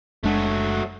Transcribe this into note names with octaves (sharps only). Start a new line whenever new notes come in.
F#1 F#3 G#3 A3 D4